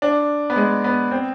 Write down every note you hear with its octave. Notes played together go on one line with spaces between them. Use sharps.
D4
B3
G#3
B3
C4